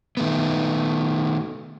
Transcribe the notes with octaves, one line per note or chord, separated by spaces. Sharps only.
D#3 A3 B3